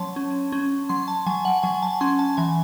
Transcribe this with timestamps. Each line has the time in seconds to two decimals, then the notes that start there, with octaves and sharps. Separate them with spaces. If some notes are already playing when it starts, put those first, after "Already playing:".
Already playing: F#3 C#4 C#5 A5 C6
0.16 C#4
0.52 C#4
0.89 F#3 C6
1.08 A5
1.26 F#3 G#5
1.45 F#5
1.63 F#3 G#5
1.82 A5
2.01 C#4 C6
2.19 A5
2.37 E3 G#5